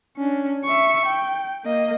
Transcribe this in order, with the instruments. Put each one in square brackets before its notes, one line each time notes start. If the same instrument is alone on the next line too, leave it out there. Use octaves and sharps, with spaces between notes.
[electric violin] C#4 D4
E5 C#6
G5
A#3 D#5